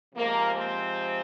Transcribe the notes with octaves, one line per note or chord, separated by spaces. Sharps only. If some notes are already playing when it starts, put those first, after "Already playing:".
C3 F3 G#3 A#3
C4